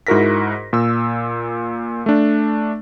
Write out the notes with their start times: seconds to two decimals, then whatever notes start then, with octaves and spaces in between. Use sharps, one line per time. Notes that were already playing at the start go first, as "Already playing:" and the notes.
0.07 G#2 E4 F#4 A#4 A#6 B6
0.73 A#2 E6
2.06 A3 D4